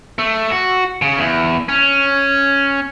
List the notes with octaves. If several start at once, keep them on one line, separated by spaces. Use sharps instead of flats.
A3
F#4
C#3
E2
C#4